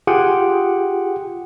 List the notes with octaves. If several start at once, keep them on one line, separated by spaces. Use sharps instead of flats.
F4 G4 G#4 F#5 G5